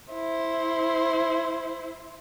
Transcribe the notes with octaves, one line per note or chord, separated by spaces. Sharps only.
E4 C5